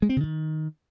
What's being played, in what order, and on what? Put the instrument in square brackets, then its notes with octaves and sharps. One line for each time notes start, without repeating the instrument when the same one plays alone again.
[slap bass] G#3
C4
C#3
D#3